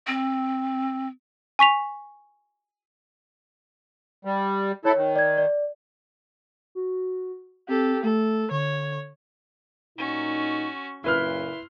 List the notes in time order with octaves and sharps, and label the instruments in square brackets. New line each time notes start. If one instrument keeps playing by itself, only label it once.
[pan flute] C4
[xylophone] G#5 C#6 B6 F7
[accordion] G3
[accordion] E4 A4 [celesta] C#5
[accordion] D#3
[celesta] D5 G#6
D5
[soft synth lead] F#4
[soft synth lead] C4 [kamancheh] G4 A4
[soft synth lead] A3 [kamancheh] A4
[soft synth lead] D3 [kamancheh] C#5
[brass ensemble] A#2 D#4 [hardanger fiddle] C#4 F#4
[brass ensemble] F#2 A#2 C#3 [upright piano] E4 B4 F6 [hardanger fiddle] C6